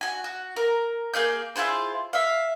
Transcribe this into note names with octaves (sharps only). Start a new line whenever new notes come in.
F#4 G#5
F#4
A#4
A#3 G#4 F5 G6
E4 F4 G#4 C5
E5 F5